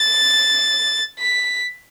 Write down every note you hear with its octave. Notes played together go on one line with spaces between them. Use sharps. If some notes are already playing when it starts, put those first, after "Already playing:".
Already playing: A6
B6